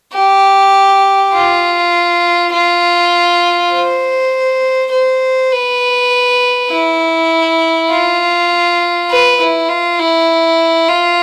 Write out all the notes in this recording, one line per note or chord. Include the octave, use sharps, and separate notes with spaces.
G4
F4
F4
C5
C5
B4
E4
F4
B4
E4
F4
E4
F4